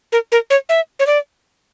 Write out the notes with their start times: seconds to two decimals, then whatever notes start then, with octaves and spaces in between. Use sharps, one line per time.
0.12 A#4
0.32 A#4
0.50 C#5
0.69 E5
1.00 C#5
1.07 D5